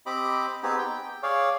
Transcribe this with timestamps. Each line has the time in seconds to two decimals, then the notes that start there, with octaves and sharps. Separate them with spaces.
0.06 C4 G4 D#5 B5 D6
0.63 B3 C4 D#4 G4 G#4
0.78 G5
1.23 G#4 C#5 D5 F5